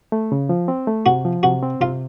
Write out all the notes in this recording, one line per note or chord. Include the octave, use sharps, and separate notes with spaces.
A3
C#3
F3
C4
A3
C3 F#4
F3
C3 F#4
C4
C3 F4